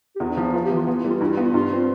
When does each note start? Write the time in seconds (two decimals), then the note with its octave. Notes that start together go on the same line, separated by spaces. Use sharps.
0.16 G4
0.20 E2 F4
0.30 D4
0.37 F3 E4
0.54 B3 F4
0.65 G4
0.71 E3
0.77 F4
0.87 B3 F4
0.98 E4
1.04 G3
1.10 F4
1.21 G2 E4
1.32 F4
1.37 B3
1.44 F4
1.54 G2 F4
1.71 C4